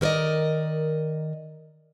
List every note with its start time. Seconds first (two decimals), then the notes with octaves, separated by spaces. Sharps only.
0.01 D#3 A#4 B4 D5 D#5